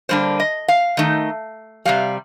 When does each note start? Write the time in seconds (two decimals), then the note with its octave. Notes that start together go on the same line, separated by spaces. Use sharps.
0.09 D3 G3 A#3 D4 C5
0.40 D#5
0.68 F5
0.97 D#3 A3 D#4
1.85 C3 D#3 G3 F5